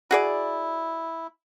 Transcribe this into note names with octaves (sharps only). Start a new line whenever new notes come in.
E4 F#4 G#4 D5